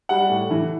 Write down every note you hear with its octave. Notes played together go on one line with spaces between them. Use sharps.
G3 F#5
A2
E3